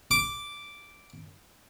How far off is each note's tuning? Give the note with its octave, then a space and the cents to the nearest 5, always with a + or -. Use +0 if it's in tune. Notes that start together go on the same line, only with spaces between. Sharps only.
D6 -5